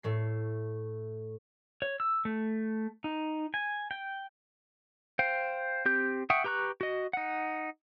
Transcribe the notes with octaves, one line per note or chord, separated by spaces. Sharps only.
A2 A3 C7
C#5
E6
A3
D#4
G#5
G5
C5 F5 G5
C4 G4 G6
E5 F#5 G5 C#6 D#6
G4 B4 A#5 C#6 F#6
F#4 D#5
D#4 F#5